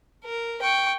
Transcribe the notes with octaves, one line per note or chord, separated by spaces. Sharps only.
A#4
G5 C#6